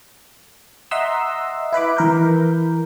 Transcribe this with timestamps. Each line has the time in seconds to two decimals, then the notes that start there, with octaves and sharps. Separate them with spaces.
0.91 D#5 E5 F#5 A#5 C6 E6
1.73 E4 B4 B5 D6
1.97 E3 A#4 G6